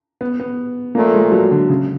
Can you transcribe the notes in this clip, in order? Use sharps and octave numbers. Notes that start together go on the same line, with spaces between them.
B3
B3
A#2 F3 A3 A#3
G#3
F#3
D3
C#3